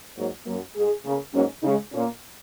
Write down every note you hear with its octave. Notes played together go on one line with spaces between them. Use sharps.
G#2 F#3 A#3 C#5
F#2 F#3 A#3
G#2 G#3 G#4
C#3 A#3
G#2 F#3 A#3 C#4
C#3 G#3 D#4
A#2 A#3 C#4